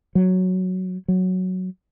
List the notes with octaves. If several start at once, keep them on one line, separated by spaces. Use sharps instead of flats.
F#3
F#3